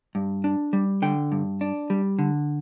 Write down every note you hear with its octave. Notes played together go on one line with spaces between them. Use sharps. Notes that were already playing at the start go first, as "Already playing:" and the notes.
G2
D4
G3
D3 G5
G2
D4
G3
D3